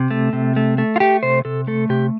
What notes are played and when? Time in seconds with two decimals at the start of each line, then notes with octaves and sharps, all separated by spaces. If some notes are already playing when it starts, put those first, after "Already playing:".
Already playing: C3
0.11 A3
0.33 C3
0.56 A3
0.78 A3
0.96 F4
1.00 A3 G4
1.23 C3 C5
1.45 C3 A4
1.67 A3 A4
1.89 C3 G4